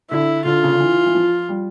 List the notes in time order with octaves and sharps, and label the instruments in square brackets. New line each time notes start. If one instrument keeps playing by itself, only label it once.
[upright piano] D3 [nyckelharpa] E4
[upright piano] D3 [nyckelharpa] F4
[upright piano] C#3
D3
E3
E3
F3
G3